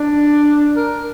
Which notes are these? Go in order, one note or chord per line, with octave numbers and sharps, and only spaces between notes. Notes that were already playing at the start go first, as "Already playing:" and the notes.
Already playing: D4
A#4